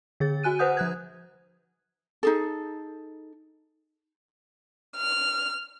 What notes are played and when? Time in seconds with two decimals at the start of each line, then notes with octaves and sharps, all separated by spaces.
0.20 D3 G#4 A6
0.43 F#4 G#5 F#6 D#7
0.59 B4 C5 F#5 D#6 G6
0.77 F3 F#6 G#6
2.23 D#4 G#4 A4
4.96 F6